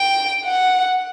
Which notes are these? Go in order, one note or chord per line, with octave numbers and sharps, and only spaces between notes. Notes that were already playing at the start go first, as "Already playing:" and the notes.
Already playing: G5
F#5